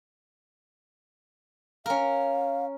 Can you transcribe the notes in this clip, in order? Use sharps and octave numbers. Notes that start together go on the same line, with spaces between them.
C#4 A#4 F5